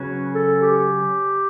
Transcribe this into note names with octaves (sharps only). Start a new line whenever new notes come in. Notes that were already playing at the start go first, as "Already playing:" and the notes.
Already playing: C#3 F#3 C#4 F#4 B4
A4
G4